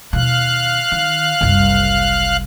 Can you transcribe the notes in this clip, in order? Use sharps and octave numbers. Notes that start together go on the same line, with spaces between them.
D#2 B2 F5 F#6
D#3
F#1 C2